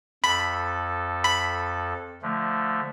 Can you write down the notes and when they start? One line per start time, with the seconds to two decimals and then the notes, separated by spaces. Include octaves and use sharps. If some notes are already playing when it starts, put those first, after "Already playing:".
0.24 F2 A4 B5
1.24 B5
2.22 D3 F3 A3